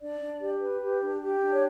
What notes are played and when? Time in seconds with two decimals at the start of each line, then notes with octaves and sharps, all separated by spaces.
0.01 D4 D5
0.20 D4
0.41 G4
0.60 B4
0.81 G4
1.01 D4
1.21 G4
1.41 D4
1.51 C#5